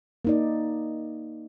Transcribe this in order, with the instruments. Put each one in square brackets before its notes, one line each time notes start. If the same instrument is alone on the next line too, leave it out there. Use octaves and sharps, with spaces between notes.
[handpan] A#3 D#4 D5